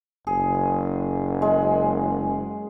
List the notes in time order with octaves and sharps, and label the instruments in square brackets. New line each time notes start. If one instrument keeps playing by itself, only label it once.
[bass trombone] F#1 [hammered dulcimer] G#4
[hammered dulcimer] G#3